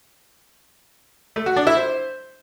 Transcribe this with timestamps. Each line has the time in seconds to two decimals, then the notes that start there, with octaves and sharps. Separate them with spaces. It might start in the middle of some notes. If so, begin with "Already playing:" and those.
1.36 A3
1.46 F#4
1.56 D4
1.67 E4
1.77 C5